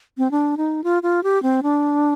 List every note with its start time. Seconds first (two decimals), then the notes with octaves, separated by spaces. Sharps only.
0.18 C4
0.31 D4
0.57 D#4
0.84 F4
1.03 F4
1.24 G4
1.43 C4
1.63 D4